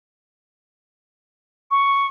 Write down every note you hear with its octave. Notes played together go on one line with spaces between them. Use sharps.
C#6